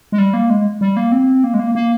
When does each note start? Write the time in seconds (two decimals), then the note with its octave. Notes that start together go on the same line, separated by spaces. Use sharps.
0.12 G#3
0.18 G3
0.34 A#3
0.50 G#3
0.81 G3
0.97 A#3
1.12 C4
1.44 A#3
1.54 G#3
1.60 A#3
1.75 A#3